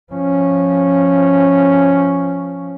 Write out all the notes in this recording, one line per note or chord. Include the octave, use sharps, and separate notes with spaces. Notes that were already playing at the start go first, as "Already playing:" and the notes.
F3 C#4